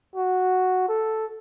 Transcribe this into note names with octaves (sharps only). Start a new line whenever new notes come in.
F#4
A4